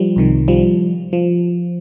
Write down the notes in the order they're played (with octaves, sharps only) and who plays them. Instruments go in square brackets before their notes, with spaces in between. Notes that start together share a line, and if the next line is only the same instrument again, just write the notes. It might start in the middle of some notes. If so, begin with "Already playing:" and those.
Already playing: [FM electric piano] F3 G3
C2 C3 D#3
F3 G3
F3